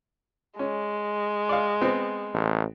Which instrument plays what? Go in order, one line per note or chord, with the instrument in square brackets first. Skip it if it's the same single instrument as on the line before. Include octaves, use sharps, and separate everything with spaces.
[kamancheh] G#3 [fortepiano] C#4
[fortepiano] D5 F5
B3 C4
[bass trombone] A1